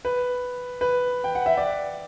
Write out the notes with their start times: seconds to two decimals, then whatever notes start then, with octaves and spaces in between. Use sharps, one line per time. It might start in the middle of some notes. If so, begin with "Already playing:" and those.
0.05 B4
0.81 B4
1.24 G5
1.35 F#5
1.46 E5
1.57 D5